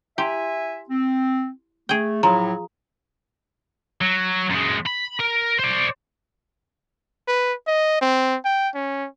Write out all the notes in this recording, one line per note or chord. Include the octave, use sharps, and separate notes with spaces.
E4 G4 E5 G#5 C6
C4
A3 G#4 G5
A2 F3 F#3 A#5 D#6
F#3
F#2 G#3
B5
A#4
C5 D5
B4
D#5
C4
G5
C#4